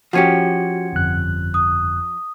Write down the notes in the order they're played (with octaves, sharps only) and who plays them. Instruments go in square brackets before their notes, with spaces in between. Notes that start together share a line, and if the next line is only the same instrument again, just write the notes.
[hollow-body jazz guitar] F3 C#4 G4 [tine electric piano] F#4 [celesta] F#5 G#6 C#7
[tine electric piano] G1 F2 F#6
[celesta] D#6